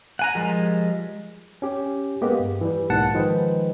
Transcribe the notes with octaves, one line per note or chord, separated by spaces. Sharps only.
F#5 G#5 A#5
F3 G3 G#3 A#4
C#4 G4
G#3 A#3 B3 G4
G2
E3 G3
B1 G#2 A#3 F#5 A5
D#3 F3 G#3 G#4 B4 G5